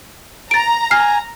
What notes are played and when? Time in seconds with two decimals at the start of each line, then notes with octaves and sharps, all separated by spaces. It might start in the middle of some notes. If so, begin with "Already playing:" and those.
0.51 A#5 A6 D7
0.91 G#5 F6 C7